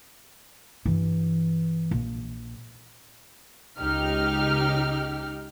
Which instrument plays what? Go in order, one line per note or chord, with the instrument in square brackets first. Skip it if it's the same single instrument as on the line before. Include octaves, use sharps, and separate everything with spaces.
[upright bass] G2 E3
A#1
[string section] C#2 D#4 G4 F6